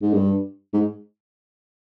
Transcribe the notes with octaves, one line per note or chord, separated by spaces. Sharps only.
G#2
G2
G#2